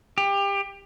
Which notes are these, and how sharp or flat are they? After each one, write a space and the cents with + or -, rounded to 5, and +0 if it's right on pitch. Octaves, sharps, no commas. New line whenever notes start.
G4 +25